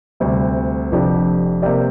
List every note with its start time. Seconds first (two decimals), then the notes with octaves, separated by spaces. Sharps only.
0.20 D2 C3 G3
0.92 F1 F2 F3 D4 G4
1.62 C3 A#3 G4 D5